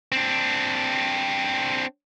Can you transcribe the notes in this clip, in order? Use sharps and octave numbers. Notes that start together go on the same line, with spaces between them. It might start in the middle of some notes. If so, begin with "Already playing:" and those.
C4 D4